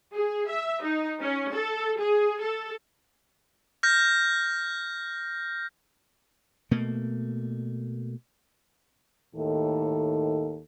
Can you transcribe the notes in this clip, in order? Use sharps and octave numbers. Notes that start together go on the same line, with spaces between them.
G#4
E5
D#4
C#4
A4
G#4
A4
F6 G6 A#6
B2 A3 A#3
D#2 A2 D#3 A4